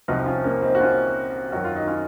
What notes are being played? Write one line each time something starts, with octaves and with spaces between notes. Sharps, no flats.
C2 C3 F3 D#4 F#4
C#4 F4
A#3 C#4
C4 D#4
F#4
C#4 F4
F#2 D#3 F#3 F#4
F4
D#4
C#4 F4